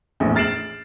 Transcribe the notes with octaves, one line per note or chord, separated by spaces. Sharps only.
A#1 E2 A2
F6 A6 C7 D7 E7 F#7